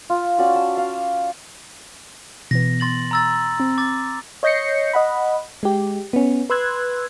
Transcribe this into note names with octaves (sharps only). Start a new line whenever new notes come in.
F4
C#4 F#4 D5
A5
F5
B2 E3 B3 A#6
C6 A6 F#7
A#5 E6 A6
C4
D6 A6
C#5 D#5 G6 A#6 C7 C#7
D#5 F#5 B5
G#3 G4
B3 C#4
B4 C6 E6 F#6 G#6